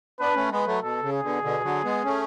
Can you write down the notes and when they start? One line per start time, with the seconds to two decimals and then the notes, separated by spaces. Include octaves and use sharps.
0.20 B3 D4 B4
0.36 A3 C#4
0.51 G#3 B3 B4
0.66 F#3 A3
0.82 B2 A4
1.02 C#3
1.13 G#4
1.23 B2 D3
1.43 B2 D3
1.63 D3 F#3
1.84 G#3 B3
2.05 A3 C#4